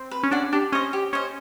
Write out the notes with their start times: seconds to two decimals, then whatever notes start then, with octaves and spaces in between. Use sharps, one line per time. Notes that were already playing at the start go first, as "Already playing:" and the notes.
Already playing: C4
0.11 B4
0.23 C#4
0.31 D4 D5 F#5
0.52 D4 G4
0.72 C#4 C5 D#5
0.93 G4
1.13 C#4 C5 D#5